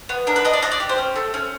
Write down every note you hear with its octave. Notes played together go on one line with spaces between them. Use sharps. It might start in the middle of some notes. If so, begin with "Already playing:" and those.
B3
D4 A#4
B4
D4 D#5
D5
D4 D#5
D5
G4
C5
C#4
A3
C#4